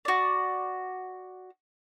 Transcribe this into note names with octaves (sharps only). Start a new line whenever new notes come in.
F#4 D5